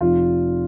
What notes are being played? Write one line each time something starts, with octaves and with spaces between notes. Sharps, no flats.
F1 F4